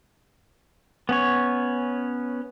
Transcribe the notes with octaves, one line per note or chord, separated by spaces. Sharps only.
B3 C#4 C#5